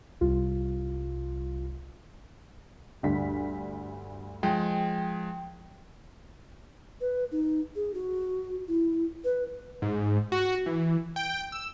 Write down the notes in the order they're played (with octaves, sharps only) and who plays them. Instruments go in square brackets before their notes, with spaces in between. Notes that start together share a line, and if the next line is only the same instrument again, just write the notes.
[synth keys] C2 F4
[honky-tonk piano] D2 G2 B6
[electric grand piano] F3 G#3 [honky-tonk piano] G5
[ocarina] B4
D#4
G#4
F#4
E4
B4
[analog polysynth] G#2
F#4
E3
G5
E6